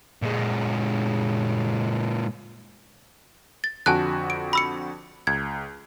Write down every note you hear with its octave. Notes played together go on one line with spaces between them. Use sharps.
A#2 G#3
A6
F2 D3 F#4 G#5 A5 F#6
D7
B5 E6 C#7
C#2 G#6